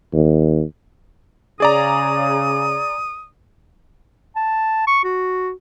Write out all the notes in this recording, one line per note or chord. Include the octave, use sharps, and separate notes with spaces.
D#2
C#3 G#4 D5 A#5 D#6
A5
C#6
F#4